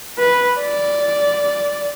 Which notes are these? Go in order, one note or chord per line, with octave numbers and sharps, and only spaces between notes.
B4
D5